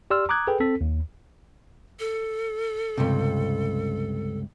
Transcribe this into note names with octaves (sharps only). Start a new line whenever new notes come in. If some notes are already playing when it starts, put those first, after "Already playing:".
G4 D5 C6 E6 F6
A#5 D6 D#6 F#6 G#6
G#4 A4 B4 G5
C4 A4 B6
D#2
A4
C#2 G2 C3